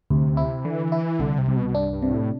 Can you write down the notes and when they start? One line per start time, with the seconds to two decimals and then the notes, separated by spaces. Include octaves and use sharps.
0.10 D2 C3
0.37 E4
0.65 D3 E3
0.92 E4
1.19 C2 D3
1.38 C3
1.48 C2
1.57 B2
1.75 G2 D4
1.93 G2
2.02 C3
2.12 A2